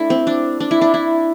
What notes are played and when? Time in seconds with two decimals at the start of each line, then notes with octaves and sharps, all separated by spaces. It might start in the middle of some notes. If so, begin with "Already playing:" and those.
Already playing: A3 D4 E4
0.10 C4
0.27 D4
0.60 D4
0.71 E4
0.81 D4
0.94 E4